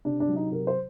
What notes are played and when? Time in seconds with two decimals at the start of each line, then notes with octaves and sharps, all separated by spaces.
0.05 C3 D4
0.20 D4
0.28 F#3
0.36 D#4
0.51 C3 A#4
0.67 C5